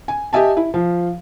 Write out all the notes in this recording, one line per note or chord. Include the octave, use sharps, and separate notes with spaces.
G#5
G4 D#5 E5 G#5 A5
E4
F3 F5